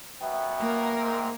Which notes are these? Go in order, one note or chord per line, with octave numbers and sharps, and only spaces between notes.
F#2 B2 B3 E5 G5
A#3 A#4
G#2 C4